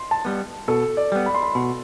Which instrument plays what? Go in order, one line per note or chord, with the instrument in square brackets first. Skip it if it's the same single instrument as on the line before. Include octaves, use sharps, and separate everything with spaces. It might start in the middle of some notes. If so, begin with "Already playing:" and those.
Already playing: [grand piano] C6
A5
[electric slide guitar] G3 B3
[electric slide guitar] B2 [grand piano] A4
[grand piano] D5
[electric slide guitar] G3 B3
[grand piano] B5
C6
B5
[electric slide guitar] B2